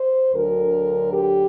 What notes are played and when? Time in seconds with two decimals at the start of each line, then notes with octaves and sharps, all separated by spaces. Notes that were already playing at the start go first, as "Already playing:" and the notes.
Already playing: C5
0.33 D2 D3 F#3 A#4
1.11 G4